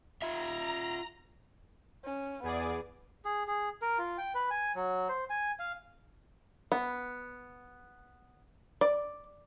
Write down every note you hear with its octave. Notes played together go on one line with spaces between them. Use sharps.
F4 E5 A#5
C#4
E2 B3 G#4 D5
G#4
G#4
A#4
F4
G5
B4
G#5
F#3
C5
G#5
F5
B3
D5